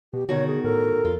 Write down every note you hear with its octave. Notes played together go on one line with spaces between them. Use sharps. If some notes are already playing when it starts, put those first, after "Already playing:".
B2 G4
B2 D3 D#3 F#4 C#5
G#4
A2 A4 A#4
F2 F4